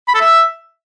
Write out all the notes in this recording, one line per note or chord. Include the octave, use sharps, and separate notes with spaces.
B5
A4
E5